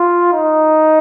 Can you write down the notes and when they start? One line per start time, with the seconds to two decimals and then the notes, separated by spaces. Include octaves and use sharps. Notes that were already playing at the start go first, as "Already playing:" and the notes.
Already playing: F4
0.33 D#4